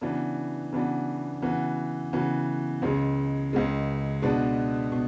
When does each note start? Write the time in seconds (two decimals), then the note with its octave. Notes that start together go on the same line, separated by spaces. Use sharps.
0.01 C#3 E3 B3 D4 F#4
0.73 C#3 E3 B3 D4 F#4
1.42 C#3 E3 B3 F#4
2.13 C#3 E3 B3 F#4
2.82 C#2 C#3 G#3
3.53 C#2 C#3 G#3
4.22 B2 G#3 B3 D4 F#4
4.92 B2